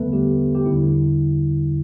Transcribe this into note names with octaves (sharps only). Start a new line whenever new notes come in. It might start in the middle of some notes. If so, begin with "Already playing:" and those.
Already playing: E2 D3 G3 A3 B3 A4 B4
G3 G4
G4
E2 D3 G3 E4